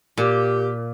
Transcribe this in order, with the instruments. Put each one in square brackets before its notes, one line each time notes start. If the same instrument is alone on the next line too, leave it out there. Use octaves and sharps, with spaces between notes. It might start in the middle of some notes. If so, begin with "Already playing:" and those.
[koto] A#2 [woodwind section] G4